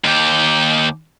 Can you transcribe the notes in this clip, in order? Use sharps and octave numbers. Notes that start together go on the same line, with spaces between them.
D#2 G4